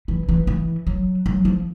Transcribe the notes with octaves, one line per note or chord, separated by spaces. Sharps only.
E3
E3
E3
F#3
F#3
F3